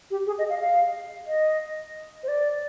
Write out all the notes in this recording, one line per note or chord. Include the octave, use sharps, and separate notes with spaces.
G4
G#4
D#5
F5
F5
D#5
C5
D5